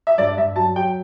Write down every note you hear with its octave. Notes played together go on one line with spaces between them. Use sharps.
E5
G2 D5
G2 E5
F#3 A5
F#3 G5